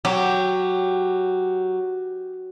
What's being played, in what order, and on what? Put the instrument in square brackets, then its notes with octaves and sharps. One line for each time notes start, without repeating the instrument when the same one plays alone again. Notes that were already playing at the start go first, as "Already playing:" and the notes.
[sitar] F#3 [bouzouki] G4